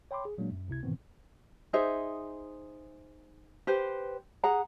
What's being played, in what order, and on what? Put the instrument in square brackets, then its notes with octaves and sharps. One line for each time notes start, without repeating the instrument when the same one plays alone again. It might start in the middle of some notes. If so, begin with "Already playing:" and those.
[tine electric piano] C#5 G5 B5 C6 D6
G#4
A#2 F#3 G#3 A#3 D4
F#2
C#2 C3 E4 G#6
G#2 B2 D#3 E3 B3 C4
[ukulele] D#4 G#4 C5 E5
G4 B4 C5
G#4 F#5 A#5